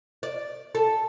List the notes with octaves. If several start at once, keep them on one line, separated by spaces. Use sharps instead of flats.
D5
A4